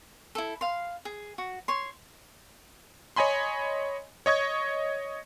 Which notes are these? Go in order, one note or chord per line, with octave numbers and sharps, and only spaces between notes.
E4 A4
F5 C6
G#4
F#4
C#5 C6
C#5 D#5 G#5 B5 C6
C#5 D#5 C#6 G#6